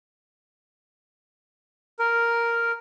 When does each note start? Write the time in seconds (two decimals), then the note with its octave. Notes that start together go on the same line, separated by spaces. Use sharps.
1.99 A#4